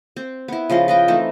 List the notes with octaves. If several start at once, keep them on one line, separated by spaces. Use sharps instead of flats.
C4
B3 E4
C#3 F3 F4 D#5
B4 D#5 G5
E3 A3 C4 D#4